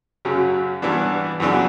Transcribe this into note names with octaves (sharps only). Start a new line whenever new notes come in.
F#2 C#3 F#3
G2 E3 B3 D4
F#2 C#3 E3 B3 D4